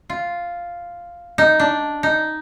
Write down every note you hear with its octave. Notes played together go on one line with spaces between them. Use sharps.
F4
D#4
D4
D#4